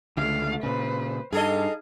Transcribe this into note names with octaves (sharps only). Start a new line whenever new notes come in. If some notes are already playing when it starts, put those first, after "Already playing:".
C#2 D3 A3 F5
A#2 C#3 B4 C5
G2 D#4 G#4 A4 D#5 F5